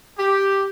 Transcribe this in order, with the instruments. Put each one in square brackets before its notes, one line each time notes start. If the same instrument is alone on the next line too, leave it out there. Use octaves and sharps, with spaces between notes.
[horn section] G4